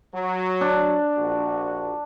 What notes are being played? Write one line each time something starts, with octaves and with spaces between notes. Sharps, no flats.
F#3
D4
A#1 F#4